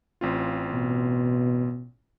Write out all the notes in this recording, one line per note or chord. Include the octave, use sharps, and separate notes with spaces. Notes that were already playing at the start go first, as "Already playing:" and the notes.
A1 C4 F4
B2